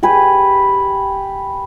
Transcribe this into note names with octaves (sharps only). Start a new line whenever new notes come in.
G4 B4 G#5